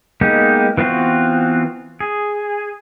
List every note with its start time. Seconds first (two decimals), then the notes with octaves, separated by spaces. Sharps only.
0.21 G#3 A#3 B3 D#4 G4
0.77 E3 B3 C4 F4 F#4
2.00 G#4